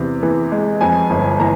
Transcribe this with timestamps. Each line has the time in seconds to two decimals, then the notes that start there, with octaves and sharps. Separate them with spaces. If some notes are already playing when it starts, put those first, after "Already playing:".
Already playing: E2 C3
0.23 E3
0.52 G#3
0.81 F2 G#5
1.10 G1
1.40 E3 A#5